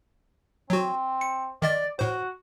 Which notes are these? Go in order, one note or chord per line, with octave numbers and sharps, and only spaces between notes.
F#3 C4 F#4
C#7
D#3 D5 D#5 A6
A2 F#4 C5